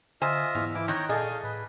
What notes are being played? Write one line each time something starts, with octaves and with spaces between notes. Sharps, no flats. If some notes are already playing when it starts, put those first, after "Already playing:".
D3 F4 C5 D#5 E5 G#5
E2 G#2
E3 E4 D6
D#3 C#5 A#5 F#6 G6
A#2 G#4 A4 D5 D#5 F5
A2 B4